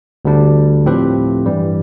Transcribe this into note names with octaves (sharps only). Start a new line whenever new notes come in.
D2 D3 G3 D4
A2 F3 C4 G4 B4
G2 E3 G3